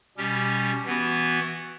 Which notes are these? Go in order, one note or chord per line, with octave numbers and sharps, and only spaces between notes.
B2 G3 C#4 G4
E3 B3 F#4